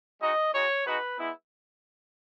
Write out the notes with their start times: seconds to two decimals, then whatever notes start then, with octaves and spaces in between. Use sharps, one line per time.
0.21 G#3 D#4 F#4 D#5
0.53 G#3 D#4 F#4 C#5
0.86 G#3 D#4 F#4 B4
1.18 G#3 B3 E4